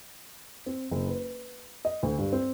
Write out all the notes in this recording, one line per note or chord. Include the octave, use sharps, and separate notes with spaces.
C4
F#1
B4
D#5
D2
G2
C4